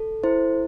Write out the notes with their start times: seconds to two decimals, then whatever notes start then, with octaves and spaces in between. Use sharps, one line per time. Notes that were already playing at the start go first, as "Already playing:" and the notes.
Already playing: A4
0.24 E4 C5